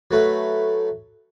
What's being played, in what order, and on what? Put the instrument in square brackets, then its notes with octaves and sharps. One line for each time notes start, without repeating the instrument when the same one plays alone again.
[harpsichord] F#3 A3 B4